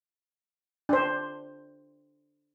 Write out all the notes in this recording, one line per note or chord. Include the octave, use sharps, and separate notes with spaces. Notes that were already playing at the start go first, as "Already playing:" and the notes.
D4 C5